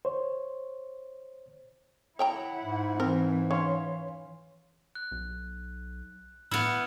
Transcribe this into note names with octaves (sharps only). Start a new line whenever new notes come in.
C5 C#5
E4 C#5 F#5 G5 A#5
G#2
E3 C4 A#4
C#4 C#5 F5 C6
F#6
B1
A2 B3 E4 E6 F6 C#7